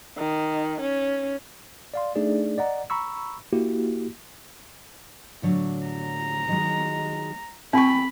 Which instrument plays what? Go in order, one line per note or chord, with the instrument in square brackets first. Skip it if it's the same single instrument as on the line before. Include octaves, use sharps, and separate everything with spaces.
[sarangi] D#3
C#4
[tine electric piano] D5 F5 C6
A3 D4 D#4 G#4 D5
D5 D#5 F#5 A#5
A#5 B5 C#6 E6
A#3 E4 F#4 G4
[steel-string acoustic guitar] A2 D3 F#3
[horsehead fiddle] A#5
[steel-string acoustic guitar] D#3 F#3 G#3
[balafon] C4 C#6 [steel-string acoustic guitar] A4 G5 G#5 [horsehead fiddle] B5